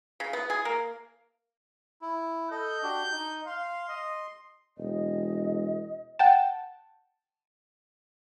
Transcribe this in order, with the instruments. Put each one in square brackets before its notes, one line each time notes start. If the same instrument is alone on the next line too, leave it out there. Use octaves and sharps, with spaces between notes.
[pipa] C#3
B3
G#4
A#3
[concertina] E4
[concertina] A4 D#5 [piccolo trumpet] G6
[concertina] D4 F#4 G4
D#4
[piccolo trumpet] F5 [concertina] C6
[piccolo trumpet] D#5
[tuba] E1 [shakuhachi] D#5
[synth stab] F#5 G5 A5